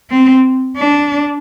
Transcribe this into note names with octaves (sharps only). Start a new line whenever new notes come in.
C4
D4